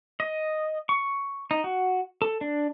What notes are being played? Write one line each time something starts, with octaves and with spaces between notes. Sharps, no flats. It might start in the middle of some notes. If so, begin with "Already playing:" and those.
D#5
C#6
D#4
F#4
A4
D4